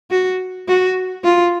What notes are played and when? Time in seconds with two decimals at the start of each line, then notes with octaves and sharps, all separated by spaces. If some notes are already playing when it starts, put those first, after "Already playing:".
0.11 F#4
0.68 F#4
1.24 F4